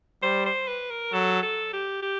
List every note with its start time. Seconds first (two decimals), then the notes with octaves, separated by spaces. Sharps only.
0.23 G3 C5
0.46 C5
0.68 B4
0.91 A#4
1.13 F#3 A4
1.43 A4
1.73 G4
2.02 G4